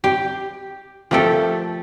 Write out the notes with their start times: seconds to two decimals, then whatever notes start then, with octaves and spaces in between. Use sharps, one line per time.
0.04 G4
1.11 F3 A3 G4 A4 A#4